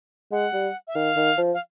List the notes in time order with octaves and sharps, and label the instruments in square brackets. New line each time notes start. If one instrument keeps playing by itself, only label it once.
[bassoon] G#3 [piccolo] F#5
[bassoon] G3
[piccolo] E5
[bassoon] D#3 [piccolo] F5
[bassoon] D#3
F3
[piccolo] F5